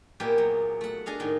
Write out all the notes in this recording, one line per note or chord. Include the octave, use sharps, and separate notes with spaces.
A#2 A#3 B3 G4 G#4
F#3
A3 F#5
D4 G#4 D#5 F5
A2 D#3